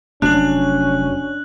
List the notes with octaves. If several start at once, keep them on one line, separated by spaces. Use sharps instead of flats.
F1 F#3 C#4 D4 F#6 F#7